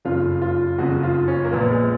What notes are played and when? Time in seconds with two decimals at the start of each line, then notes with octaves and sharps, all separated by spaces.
0.05 F#1 F2 C#3 F4
0.42 F4
0.78 F#1 F2 C#3 F#4
1.03 F4
1.28 C#4
1.45 A#3
1.52 A#1 A#2 B3
1.71 G#3